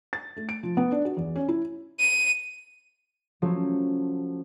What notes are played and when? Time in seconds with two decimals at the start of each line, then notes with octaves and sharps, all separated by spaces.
0.13 A6
0.37 A3
0.49 D7
0.63 F3
0.77 B3
0.92 D4
1.05 F#4
1.17 E2
1.36 C#4
1.48 E4
2.00 D#7
3.42 F3 F#3 A3 C#4